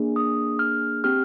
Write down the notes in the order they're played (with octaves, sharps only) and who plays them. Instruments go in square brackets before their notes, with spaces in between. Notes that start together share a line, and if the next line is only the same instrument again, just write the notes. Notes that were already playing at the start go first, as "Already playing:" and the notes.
Already playing: [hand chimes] A#3 D4 G#4
D#6
F6
C4 G4 F6